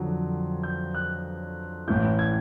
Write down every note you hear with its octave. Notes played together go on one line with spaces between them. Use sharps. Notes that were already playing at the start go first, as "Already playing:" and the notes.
Already playing: F2 D3 F#3
G6
F#6
A1 A2 E3 G6
G#6